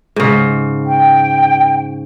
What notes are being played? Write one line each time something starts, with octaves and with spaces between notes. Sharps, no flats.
G#2 C#3
G5